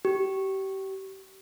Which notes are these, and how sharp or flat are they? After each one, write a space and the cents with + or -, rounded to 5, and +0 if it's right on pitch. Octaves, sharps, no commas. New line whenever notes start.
G4 -30